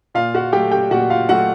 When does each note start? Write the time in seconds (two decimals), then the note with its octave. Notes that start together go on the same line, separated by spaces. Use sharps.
0.14 A#2 F4 F5
0.34 F#4 F#5
0.53 F#3 A3 G4 G5
0.71 G4 G5
0.91 A#2 F#4 F#5
1.10 F4 F5
1.29 F#3 A3 F#4 F#5